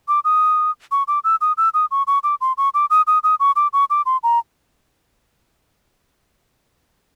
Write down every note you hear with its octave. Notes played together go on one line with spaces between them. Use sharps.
D6
D#6
C#6
D6
E6
D#6
E6
D#6
C#6
C#6
D6
C6
C#6
D6
D#6
D#6
D#6
C#6
D6
C#6
D6
C6
A#5